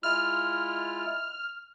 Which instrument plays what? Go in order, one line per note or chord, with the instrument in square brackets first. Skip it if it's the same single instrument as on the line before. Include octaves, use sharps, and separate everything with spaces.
[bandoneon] G#3 E4 F4 [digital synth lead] F6